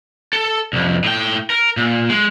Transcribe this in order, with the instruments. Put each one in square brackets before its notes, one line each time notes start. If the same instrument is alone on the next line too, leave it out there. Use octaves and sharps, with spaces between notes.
[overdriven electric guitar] A4
C2 F2
A2 G5
A#4
A#2
G#3